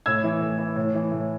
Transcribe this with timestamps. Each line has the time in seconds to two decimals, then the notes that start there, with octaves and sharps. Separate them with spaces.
0.06 A2 E6 G#6
0.24 E3
0.41 A2
0.58 E3
0.76 A2
0.95 E3
1.12 A2